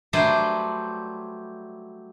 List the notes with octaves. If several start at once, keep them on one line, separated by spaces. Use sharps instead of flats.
F#3 G3 A3 D4 B4 C5